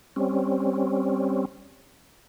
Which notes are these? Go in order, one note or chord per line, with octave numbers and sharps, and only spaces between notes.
G3 C4 C#4